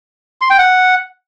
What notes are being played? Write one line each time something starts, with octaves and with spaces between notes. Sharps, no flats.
C6
G5
F#5